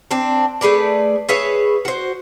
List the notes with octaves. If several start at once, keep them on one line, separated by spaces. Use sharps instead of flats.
C4 D4
A3 G#4 B4 D5
G#4 B4 C#5 E5
F#4 C5